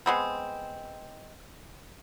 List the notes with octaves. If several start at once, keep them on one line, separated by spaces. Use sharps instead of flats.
G#3 B3 C4